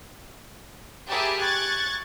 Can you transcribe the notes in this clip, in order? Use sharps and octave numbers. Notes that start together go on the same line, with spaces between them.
G4 G#4 A#4 E5 A5 B5
C#6 F#6 G#6 A6